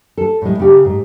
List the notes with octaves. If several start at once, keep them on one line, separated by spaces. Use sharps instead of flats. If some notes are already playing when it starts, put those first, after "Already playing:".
A4
A2 G#3
C#3 G4
G#2